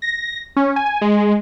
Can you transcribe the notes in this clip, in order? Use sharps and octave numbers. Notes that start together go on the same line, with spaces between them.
A#6
C#4
G#5
G#3